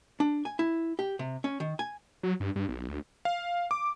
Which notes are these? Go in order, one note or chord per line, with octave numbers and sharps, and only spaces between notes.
D4
G#5
E4
G4
C3
C#4
D#3
G#5
F#3
G2
G2
B1
D2
F5
D6